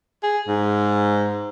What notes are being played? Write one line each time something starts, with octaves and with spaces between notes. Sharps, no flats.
G#4
G#2